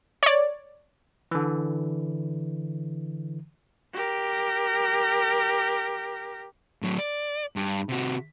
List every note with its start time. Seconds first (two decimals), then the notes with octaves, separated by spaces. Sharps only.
0.23 C#5 D5
1.31 D3 E3
3.94 G4 A#4
6.82 A2 F#3
6.98 D5
7.56 G2
7.89 C3 F#4